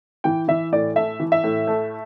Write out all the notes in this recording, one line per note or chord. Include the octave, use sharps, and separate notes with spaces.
E3 G5
E3 E5
A2 D5
A3 E5
E3
E5
A2
A3